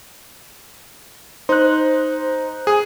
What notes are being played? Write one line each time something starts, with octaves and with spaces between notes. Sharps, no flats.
D#4 C5 F#6
G#4